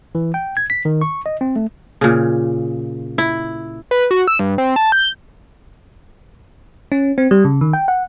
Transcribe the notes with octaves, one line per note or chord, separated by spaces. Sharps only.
E3
G5
G#6
B6
D#3
C#6
D#5
C4
A3
A#2 C#3
E4
B4
F#4
E6
G2
C4
A5
G6
C#4
C4
G3
C#3
D#3
G5
F#5